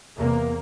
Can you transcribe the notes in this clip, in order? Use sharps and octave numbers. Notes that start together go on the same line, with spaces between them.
E2 C3 A#3